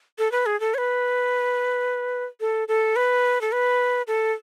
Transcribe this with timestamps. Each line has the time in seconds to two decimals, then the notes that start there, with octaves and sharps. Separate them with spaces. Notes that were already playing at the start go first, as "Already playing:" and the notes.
0.19 A4
0.32 B4
0.46 G#4
0.60 A4
0.74 C#5
0.78 B4
2.40 A4
2.68 A4
2.96 B4
3.41 A4
3.52 B4
4.07 A4